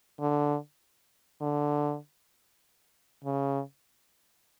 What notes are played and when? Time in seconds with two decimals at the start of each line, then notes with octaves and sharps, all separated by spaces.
0.20 D3
1.42 D3
3.24 C#3